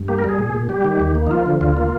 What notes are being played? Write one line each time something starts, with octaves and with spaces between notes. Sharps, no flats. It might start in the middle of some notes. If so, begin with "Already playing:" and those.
Already playing: G2
A#3 G4
A#4
G3 G#4
A#2
A#2
G3 G4
D#3
D#2
A#3
D#4
F3 F4
D3
D2 F4
A#3